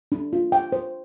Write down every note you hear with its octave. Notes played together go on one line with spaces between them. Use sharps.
D4
F4
G5
C5